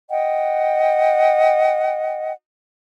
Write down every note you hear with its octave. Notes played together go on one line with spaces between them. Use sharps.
D#5 F#5 G5